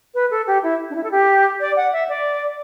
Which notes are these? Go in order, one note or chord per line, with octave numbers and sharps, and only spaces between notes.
B4
A4
G4
E4
D4
E4
A4
G4
D5
F#5
E5
D5